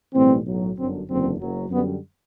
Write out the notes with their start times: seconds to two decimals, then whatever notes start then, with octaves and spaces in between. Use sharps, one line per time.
0.12 B1 A2 E3 G3 C4
0.45 B1 A2 F#3
0.76 G1 F#2 D3 F#3 C4
1.07 F#1 E2 D3 F#3 C4
1.40 F#1 F#2 F#3
1.71 F#2 D3 G3 B3